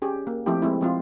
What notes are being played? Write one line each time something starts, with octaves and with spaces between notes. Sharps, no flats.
C#4 G4 G#4
A#3
F3 A3 C4 E4 G4
G#3 C4 E4
F3 C4 F4